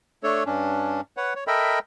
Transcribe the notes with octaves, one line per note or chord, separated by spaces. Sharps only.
A3 D4 A4 C#5
G2 C#4 D4
B4 C#5 F#5
C#5
A4 A#4 D#5 E5 G5 B5